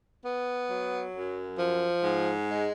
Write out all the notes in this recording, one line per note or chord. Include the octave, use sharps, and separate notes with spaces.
B3
F#3
F#2
F3
G#2
G#3